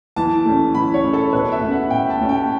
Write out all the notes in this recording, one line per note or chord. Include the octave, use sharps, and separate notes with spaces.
E3 A5
A3 C#4
E3 B5
C#5
A3 C#4
A4
B2 B4
E5
A3 C#4
F#5
B2 G5
A5
A3 C#4
G5